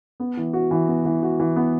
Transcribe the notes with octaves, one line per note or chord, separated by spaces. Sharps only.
B3
E3
F#4
E3
B3
E3
F#4
E3
B3